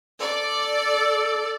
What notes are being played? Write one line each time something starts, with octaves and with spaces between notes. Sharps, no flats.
A4 D5